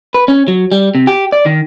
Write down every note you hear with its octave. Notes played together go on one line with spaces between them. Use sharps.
B4
C#4
F#3
G3
C3
G4
D5
D#3